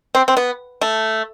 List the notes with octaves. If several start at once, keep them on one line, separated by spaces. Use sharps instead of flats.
C4
C4
B3
A3